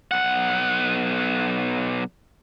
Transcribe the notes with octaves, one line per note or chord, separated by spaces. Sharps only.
B1 F#5